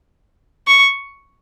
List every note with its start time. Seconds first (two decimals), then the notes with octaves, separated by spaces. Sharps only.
0.68 C#6